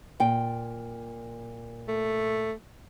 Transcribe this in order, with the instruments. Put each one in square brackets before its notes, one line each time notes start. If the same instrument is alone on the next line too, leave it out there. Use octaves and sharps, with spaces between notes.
[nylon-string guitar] A#2 G5
[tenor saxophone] A3